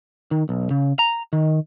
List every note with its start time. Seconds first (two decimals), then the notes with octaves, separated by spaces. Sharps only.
0.31 D#3
0.49 B1
0.71 C#3
0.99 A#5
1.33 D#3